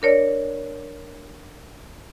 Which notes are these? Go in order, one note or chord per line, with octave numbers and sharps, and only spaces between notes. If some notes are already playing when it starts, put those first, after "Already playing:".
D4 A#4 C#5 D5